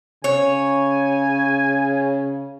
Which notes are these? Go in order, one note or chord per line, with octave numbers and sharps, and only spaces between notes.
C#3 C#5 G#5